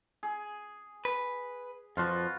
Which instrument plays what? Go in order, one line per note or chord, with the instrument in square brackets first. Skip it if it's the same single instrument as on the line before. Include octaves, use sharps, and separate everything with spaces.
[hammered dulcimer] G#4
[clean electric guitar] B4
[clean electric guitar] F2 F3 [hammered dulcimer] F4 F#4 B4